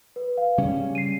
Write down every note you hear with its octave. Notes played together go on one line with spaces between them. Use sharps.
B4
F5
C#3 G3 C#4
C7 D#7